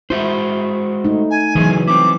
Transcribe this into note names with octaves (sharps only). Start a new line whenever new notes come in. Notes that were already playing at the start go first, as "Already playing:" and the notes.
G#3 E4 F#4 C5
A3 D#4
G#5
C#3 E3 F#3 A3 G#4
C4 E4 D6